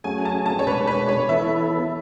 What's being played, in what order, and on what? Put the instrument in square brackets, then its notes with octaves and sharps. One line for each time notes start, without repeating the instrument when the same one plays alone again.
[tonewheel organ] F#3 A3 C#4 G#4 [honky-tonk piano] G#5
[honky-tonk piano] A5
A5
C#5
[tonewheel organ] B2 G#3 D4 [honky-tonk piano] B4
[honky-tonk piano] B4
C#5
[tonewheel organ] E3 B3 E4 A4 [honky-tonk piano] E5